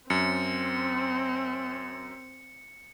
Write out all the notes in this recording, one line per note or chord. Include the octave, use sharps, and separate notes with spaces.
F#2 C4 C#7